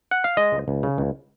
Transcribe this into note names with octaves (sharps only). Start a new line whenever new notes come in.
F#5
F5
G#3 D#5
C#2
C#2
C#3
C#2